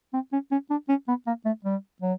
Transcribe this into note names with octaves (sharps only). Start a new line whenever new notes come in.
C4
C#4
C#4
D4
C#4
B3
A#3
A3
G3
F#3